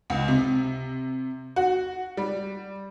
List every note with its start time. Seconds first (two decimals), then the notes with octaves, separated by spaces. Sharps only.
0.10 C#2
0.28 C3
1.56 F#4
2.17 G3